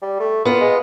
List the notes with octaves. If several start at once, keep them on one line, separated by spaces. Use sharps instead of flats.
G3
A3
A#2 B3 F4
G#3